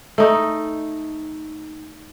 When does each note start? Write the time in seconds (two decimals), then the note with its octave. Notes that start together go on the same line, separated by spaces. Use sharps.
0.18 A3 D#4